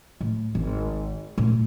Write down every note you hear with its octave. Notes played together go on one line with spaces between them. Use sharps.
A2
G#1
A#2 A3